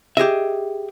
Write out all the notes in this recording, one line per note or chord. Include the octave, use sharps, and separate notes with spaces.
G4 G#4 D#5 E5